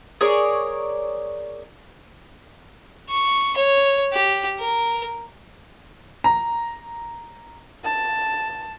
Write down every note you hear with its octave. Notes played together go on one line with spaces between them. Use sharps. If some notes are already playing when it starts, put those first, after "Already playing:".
G#4 A#4 C#5 D5
C#6
C#5
G4
A#4
A#5
A5